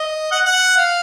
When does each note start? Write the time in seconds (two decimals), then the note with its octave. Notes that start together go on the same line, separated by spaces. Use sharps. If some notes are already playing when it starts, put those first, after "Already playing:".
Already playing: D#5
0.32 F#5
0.46 F#5
0.77 F5